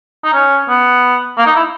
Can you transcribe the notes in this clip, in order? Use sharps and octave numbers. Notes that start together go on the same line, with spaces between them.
D#4
C#4
B3
A#3
D#4
E4